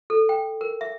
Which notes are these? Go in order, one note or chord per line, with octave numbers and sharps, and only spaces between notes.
A4
G5
A#4
E5